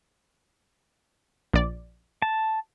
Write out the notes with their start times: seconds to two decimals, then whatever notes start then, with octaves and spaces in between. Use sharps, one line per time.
1.53 A#1 D5
2.22 A5